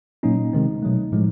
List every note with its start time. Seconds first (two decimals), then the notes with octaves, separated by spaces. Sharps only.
0.23 A#2 F#3 A#3 C#4 D#4
0.53 C3 D#3 G#3 C4
0.83 B2 F#3 A3
1.12 A2 F3 G#3